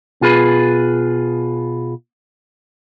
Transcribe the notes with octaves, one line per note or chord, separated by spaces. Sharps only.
B2 F4 G#4 B4